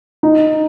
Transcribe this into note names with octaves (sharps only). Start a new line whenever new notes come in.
D#4